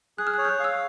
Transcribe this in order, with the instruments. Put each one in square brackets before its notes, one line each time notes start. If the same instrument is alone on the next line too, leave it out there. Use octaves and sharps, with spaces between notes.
[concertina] G#4 [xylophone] F#6
[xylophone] F6
[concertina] C#5 [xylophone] F#6
[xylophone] G6
F#6
[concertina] F5 [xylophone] E6